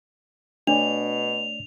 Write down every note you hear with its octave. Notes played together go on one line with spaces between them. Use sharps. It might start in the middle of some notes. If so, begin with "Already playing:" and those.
B2 A3 D4 C#5 D5 F7